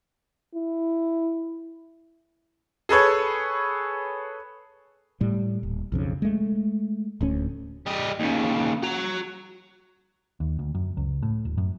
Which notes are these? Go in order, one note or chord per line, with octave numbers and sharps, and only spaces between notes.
E4
G#4 A4 B4 C#5
A2 G3
D#1
B1 F2 C#3
G#3 A3
D1 D2 C#4
G3 D#5
D#2 C#3
F#4 A#5
D#2
D2
F#2
C#2
A2
D#1
F#2